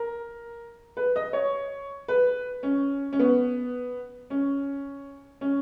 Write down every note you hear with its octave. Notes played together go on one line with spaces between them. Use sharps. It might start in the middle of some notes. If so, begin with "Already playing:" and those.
Already playing: A#4
B4
D#5
C#5
B4
C#4
C#4
B3
C#4
C#4